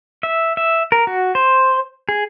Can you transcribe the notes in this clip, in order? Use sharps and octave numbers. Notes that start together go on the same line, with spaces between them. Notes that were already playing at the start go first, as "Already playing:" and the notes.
E5
E5
A#4
F#4
C5
G#4